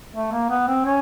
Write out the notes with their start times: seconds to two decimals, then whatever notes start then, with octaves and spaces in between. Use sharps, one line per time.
0.14 A3
0.32 A#3
0.50 B3
0.68 C4
0.86 C#4